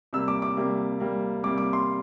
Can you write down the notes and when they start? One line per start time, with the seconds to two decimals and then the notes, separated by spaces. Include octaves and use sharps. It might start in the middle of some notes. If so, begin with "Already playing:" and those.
0.13 C3 G3 A#3 E6
0.28 D6
0.42 D6
0.57 C3 G3 A#3
1.00 C3 G3 A#3
1.43 C3 G3 A#3 D6
1.58 D6
1.73 C6